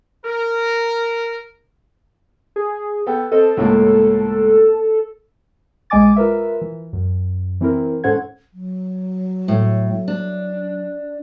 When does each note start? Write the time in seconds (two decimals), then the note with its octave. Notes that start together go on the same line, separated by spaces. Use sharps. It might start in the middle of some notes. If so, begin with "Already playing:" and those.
0.24 A#4
2.56 G#4
3.07 B3 A4 G5
3.32 C4 A4 D#5
3.57 C#2 A2 A#3
5.90 A#1 G#3 D#5 G#5 D6 A6
6.16 F4 A#4 B4 E5
6.61 E3
6.93 F#2
7.61 E3 C4 E4 A#4
8.04 G#2 C#4 A4 C5 F#5 G#6
8.53 F#3
9.48 A2
10.08 D4